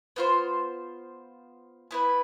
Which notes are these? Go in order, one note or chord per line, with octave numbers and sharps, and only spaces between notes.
B3 F4 C5
B3 E4 B4